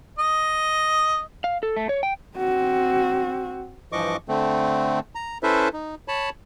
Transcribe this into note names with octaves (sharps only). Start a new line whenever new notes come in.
D#5
F5
A4
A3
C#5
G5
C4 F#4
G2 E3 F3 D#5 C#6 D6
D3 A3 C4
A#5
C#4 E4 A4 B4 C5 E5
D#4
C#5 A5 B5